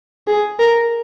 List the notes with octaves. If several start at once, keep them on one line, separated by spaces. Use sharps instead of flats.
G#4
A#4